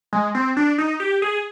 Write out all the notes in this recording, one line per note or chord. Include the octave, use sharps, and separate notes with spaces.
G#3
C4
D4
D#4
G4
G#4